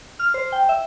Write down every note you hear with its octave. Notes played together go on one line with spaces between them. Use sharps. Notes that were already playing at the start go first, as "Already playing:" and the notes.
F6
C5
G5
E5